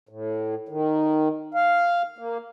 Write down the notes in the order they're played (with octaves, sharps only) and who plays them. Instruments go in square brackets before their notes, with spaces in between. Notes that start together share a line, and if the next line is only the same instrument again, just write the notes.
[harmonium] A2
D#3
F5
A#3